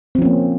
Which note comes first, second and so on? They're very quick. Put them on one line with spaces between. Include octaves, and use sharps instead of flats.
C4 F3 C#4 A#3